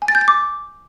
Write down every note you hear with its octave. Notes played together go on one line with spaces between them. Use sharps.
G#5
A6
G6
A6
D6